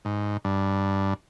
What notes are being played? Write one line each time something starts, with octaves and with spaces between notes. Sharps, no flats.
G#2
G2